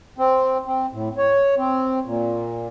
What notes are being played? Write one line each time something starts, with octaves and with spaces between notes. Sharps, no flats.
C4
C4
A2
C#5
C4
A#2